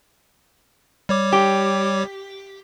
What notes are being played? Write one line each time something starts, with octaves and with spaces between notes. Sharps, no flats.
G3 C#5 D6
G4